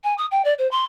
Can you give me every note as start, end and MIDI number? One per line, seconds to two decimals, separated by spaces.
0.03 0.13 80
0.17 0.25 87
0.31 0.42 79
0.44 0.53 74
0.58 0.69 72
0.71 0.84 84